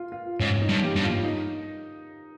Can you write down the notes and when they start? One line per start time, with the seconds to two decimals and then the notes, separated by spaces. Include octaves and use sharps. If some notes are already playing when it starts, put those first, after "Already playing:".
Already playing: F4
0.12 F4
0.40 G#2 C#4
0.61 D#4
0.69 G2
0.82 G4
0.96 G2
1.03 F4
1.24 D#4